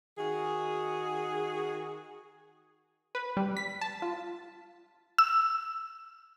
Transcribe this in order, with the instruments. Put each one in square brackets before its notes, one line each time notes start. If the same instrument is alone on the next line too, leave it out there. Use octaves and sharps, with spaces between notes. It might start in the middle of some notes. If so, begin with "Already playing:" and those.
[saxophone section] D#3 F#4 G#4
[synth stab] B4
G3
B6
A5
F4
[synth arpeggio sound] E6